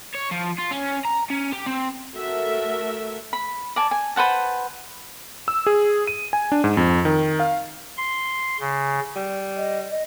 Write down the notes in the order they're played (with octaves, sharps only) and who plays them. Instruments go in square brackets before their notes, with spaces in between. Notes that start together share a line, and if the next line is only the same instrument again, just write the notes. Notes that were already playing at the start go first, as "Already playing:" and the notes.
[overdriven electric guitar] C#5
F3
F4
C#4
A#5
C#4
G4
C4
[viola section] A3 F#4 A4 A#4 E5
[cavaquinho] B5
D5 G#5 A5
G#5
B4 C5 F#5 A5
[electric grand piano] E6
G#4
D#7
G#5
D4
G#2
F2
D#3
F5
[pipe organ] C6
C#3
[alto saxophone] G3
[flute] D#5
D#5